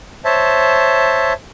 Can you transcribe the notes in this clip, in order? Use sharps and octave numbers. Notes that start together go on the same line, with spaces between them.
C5 C#5 E5 A5